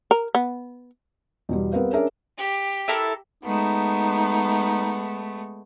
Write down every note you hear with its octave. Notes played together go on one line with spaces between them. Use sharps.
A#4
B3
E2 B2 G3
G3 B3 C4 A#4 B4 F5
C#4 D4 G#4 A#4 E5
G4
E4 A4 A#4
G#3 A3 B3 D#4